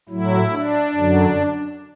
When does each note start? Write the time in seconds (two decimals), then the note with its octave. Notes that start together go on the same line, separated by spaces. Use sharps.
0.09 A2 F#3 E4
0.52 D4
0.95 F#2 D3 F#3